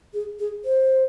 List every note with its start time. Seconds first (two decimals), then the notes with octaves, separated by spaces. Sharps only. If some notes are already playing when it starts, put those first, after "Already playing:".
0.13 G#4
0.39 G#4
0.65 C5